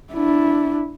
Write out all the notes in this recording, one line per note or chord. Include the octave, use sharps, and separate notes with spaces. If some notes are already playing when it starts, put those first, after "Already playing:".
D4 E4